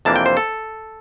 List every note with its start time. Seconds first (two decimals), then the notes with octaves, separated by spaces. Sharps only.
0.05 F2 C3 E3 A#3 D4 A5
0.16 G5
0.26 C5
0.37 A4